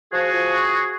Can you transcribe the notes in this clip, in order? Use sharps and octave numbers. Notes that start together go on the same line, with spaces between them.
F3 F#4 G#4
F3